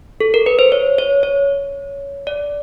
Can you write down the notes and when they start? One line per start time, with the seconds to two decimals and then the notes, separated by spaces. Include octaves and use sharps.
0.20 A4
0.34 A#4
0.46 B4
0.59 C5
0.72 C#5
0.98 C#5
1.23 C#5
2.27 D5